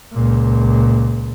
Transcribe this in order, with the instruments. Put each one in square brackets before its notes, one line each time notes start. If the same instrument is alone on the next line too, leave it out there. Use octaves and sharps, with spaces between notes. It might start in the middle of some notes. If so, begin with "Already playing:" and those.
[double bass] C#2 A#2